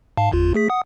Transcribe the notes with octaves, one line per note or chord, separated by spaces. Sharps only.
G#2 F5 A5
G1 E2 F4
A3 G#4 B6
F#5 D#6